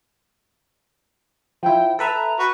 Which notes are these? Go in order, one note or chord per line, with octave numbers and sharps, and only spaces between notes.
F3 E4 G5
A4 B4 E5 A#5
F#4 B4